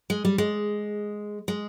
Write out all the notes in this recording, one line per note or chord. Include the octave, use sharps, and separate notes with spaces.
G#3
G3
G#3
G#3